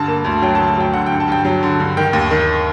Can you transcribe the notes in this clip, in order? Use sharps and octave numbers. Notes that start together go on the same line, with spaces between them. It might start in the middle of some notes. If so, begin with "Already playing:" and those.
Already playing: G2 D3 A5
A#3
D2
F#3 G5
A5
D2
A5
F#3 G5
D3 F#5
G5
G2
A5
G2 G5
F#3
D3
G2
D#3 G5
D#2
D#3